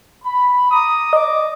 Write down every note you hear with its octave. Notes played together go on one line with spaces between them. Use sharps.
B5
A#5 D6 D#6
D5 D#5 D6